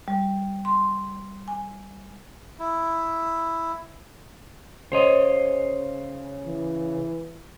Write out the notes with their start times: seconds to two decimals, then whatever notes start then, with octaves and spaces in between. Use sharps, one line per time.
0.08 G3
0.65 C6
1.48 G#5
2.59 E4
4.92 C#3 C5 C#5 D#5
6.46 E3